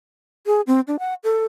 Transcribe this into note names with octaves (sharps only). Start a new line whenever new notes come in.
G#4
C4
D4
F#5
A4